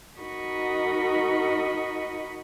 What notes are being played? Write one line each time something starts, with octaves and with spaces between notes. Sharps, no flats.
D#4 F#4 A#4 D#5 B5 C#6